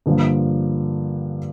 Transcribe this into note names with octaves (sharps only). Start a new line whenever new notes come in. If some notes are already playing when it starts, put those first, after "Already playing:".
G2 D3 F3 A#3 F4